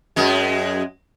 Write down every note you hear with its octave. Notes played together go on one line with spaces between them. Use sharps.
F#2 G#3